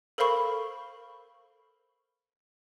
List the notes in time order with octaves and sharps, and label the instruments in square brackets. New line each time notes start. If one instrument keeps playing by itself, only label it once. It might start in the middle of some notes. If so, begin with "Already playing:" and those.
[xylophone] A4 A#4 C5 F5 B5 C#6